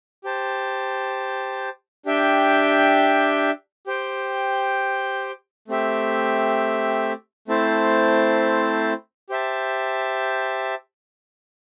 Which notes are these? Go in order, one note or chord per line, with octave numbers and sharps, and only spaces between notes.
G4 C5 A5
D4 G4 E5 G5
G4 C5 G5
A3 C4 G4 E5
A3 C4 E4 C5 A5
G4 C5 E5 A5